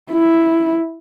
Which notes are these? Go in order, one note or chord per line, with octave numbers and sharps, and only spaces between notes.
E4